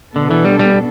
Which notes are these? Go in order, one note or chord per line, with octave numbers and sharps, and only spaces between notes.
B2 D3 B3 D4 A4
E3
G3
G3